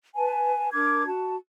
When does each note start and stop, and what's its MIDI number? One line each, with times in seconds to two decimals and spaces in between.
0.16 0.69 71
0.16 0.69 80
0.16 0.69 81
0.72 1.06 62
0.72 1.06 70
0.72 1.06 86
0.72 1.06 92
1.07 1.36 66
1.07 1.36 81